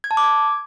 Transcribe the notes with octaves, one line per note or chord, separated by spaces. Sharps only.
G#6
A5
D6
G#6